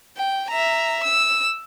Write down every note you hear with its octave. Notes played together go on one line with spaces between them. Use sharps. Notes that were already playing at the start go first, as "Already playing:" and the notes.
G5
E5 A#5
E6